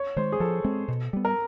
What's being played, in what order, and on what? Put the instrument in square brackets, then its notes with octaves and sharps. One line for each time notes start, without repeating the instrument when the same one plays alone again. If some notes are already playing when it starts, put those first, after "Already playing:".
Already playing: [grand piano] C#5
[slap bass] D#3 G#3 [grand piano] C5
[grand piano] G#4
[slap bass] F3 [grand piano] A4
[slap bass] G#3 C4
B2
G3 B3
[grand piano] A#4